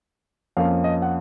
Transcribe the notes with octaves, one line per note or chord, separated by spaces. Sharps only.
F2 F3 A#3 C#4 F5
D#5
F#5